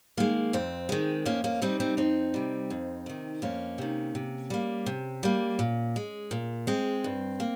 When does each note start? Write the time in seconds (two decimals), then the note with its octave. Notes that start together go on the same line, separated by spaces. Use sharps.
0.17 D#3 G#3 A#3
0.53 F2 C4
0.89 D#3 G#3
1.25 F2 A#3 C#4
1.44 A#3 C#4
1.62 C3 G3 C4 D#4
1.80 C4 D#4
1.97 F2 C4 D#4
2.34 C3 G3
2.70 F2
3.06 C3 D#3
3.42 F2 A#3 C#4
3.78 C3 D#3
4.15 C3
4.50 G3 A#3
4.86 C3
5.23 G3 A#3
5.59 A#2
5.96 G#3
6.31 A#2
6.67 G#3 C4
7.04 G2
7.40 A#3